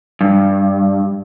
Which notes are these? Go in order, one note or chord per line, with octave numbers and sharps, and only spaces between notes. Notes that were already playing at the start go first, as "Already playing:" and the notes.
G2